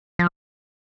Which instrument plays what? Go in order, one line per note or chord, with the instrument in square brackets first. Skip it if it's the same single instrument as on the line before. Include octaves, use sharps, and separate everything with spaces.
[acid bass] F3